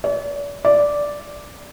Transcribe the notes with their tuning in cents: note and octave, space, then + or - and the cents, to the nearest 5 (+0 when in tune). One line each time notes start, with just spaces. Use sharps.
D5 -45
D5 -5